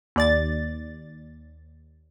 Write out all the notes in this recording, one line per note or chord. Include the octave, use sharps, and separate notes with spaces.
D#2 D5 A6